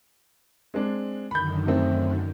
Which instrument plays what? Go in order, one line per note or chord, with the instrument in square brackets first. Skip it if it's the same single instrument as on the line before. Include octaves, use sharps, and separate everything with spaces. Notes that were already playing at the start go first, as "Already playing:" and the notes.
[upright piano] G#3 C4 D4
[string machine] F#2 D3 D#3 [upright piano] B5 G6
[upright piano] A3 C4